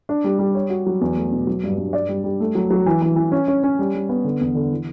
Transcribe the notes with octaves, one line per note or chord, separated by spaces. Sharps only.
D4
G3
G3
C#5
F#4
F#3
E2
A3
B2
F#3
G2
G2
D5
G3
G3
A3
F#3
F#3
E3
E3
E3
C#4
C#4
C#4
G3
G3
B3
D3
E2
D3
E3